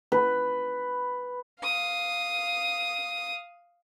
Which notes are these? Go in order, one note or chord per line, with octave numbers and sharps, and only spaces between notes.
B4
F5 D#6